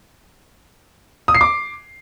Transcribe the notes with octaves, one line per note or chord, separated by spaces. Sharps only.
D#6
C7
D6